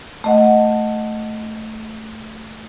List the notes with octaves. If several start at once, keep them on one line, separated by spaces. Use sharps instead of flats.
A3 D#5 F#5